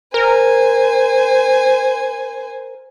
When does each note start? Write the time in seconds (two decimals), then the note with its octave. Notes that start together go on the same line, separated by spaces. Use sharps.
0.14 A#4 C5 G#5